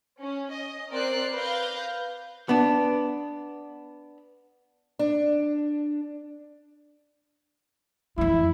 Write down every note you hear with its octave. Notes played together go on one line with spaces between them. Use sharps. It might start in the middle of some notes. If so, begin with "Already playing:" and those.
C#4
D#5
C4 A#4 D5 F#6 C7
B4 F5 G6 A#6
B3 D4
D4
F2 E3 E4